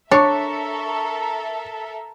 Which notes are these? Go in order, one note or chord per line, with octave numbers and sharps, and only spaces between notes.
D4 A4 A#4 C#5 E5 A5 C#6